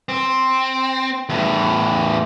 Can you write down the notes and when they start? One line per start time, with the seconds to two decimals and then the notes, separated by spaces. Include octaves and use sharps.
0.09 C4
1.29 E2 A2